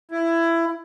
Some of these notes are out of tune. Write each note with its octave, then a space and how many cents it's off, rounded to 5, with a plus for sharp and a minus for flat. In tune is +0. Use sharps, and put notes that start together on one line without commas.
E4 +15